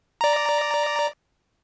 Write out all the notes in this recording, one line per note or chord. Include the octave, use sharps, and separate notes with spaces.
D5 A#5